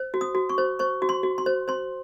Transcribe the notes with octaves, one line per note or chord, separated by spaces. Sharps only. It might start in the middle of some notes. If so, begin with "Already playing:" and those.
Already playing: C5
F#4
D#6
F#4
C#6
C5
C5 C#6
F#4
C6
F#4
C6
C5
C5 C6